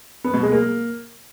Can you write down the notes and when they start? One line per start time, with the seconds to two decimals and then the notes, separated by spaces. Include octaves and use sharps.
0.24 B3
0.34 B2
0.43 G#3
0.52 A#3